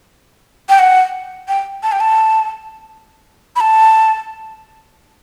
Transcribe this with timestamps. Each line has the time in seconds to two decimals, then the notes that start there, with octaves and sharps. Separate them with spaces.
0.69 G5
0.79 F#5
1.48 G5
1.83 A5
1.92 G5
2.00 A5
3.56 B5
3.60 A5